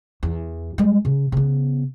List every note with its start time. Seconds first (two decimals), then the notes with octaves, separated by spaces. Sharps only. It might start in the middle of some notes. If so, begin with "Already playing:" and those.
0.23 E2
0.78 G3 G#3
1.05 C#3
1.32 C#3 B3